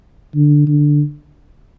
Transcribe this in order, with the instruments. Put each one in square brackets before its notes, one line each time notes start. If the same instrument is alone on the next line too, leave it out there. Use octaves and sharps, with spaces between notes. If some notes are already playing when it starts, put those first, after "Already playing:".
[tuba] D3
D3